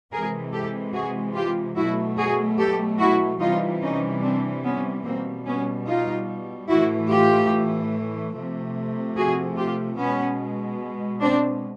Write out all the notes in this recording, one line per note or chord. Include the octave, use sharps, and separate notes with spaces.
C3 E3 G#3 G#4 A#4
G4 A4
F#4 G#4
F4 G4
B2 F#3 A3 E4 F#4
F#4 G#4
G4 A4
E4 F#4
C3 E3 G3 D#4 F4
C#4 D#4
C4 D4
B3 C#4
B2 G3 A#3 C4
B3 C#4
D#4 F4
A2 E3 A3 E4 F#4
F4 G4
C3 F3 A3
F#4 G#4
F4 G4
B2 G#3 B3 C#4
C4 D4